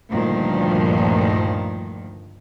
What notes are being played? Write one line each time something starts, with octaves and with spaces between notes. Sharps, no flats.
D2 G2 A#2 D#3 F3